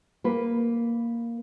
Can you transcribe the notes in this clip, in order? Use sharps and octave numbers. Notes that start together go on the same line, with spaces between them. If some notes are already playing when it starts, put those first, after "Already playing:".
A#3 B4